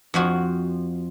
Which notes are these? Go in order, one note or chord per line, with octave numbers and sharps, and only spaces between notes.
F2 F3 F#4